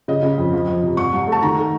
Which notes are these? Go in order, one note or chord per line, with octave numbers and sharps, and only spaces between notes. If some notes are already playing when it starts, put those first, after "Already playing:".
C#3 D#5
C#3
F2
F3
F3
C3
C2 C#6
C2
A3 A5
D#3 A#5
A3